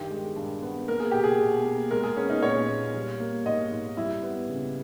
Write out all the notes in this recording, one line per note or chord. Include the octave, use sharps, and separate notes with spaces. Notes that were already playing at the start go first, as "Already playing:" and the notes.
Already playing: G2 D#3 G4
G#3
G2
B3
A#3 A#4
G#4
B2 G4
G#4
B2
A#3
G#3 A#4
G#4
B3 C#4
D#4
A#2 C#5
A#2
G3
A#3
G#2 D#5
G#2
G3 E4
B3
C#3